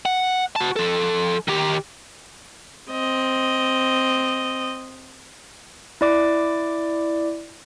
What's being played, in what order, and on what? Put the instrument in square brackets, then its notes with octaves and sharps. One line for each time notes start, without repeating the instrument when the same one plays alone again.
[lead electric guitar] F#5
F#4 A5
F3 A4
D#3 G4
[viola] C4 D#5
[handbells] E4 D5 D6